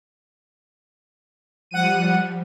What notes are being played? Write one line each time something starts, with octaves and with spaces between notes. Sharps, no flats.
F3 G3 F#5 D#7